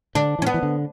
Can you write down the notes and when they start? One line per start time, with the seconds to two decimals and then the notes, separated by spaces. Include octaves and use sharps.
0.15 D3 D4
0.39 E3
0.42 C#4
0.47 B3
0.54 E3
0.63 D3